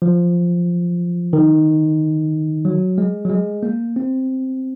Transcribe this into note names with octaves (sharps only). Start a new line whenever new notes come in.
F3
D#3
F#3
G#3
F#3
G#3
A#3
C4